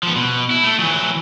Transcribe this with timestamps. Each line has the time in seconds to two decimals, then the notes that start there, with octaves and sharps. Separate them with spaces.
0.03 F3 B3
0.16 B2
0.51 E4
0.63 A3
0.79 E3 F#3